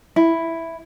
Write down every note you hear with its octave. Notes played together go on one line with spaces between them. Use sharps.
E4